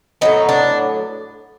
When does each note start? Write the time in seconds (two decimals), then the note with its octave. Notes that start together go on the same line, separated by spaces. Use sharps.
0.21 A2 F#3 B3 D#4
0.49 D4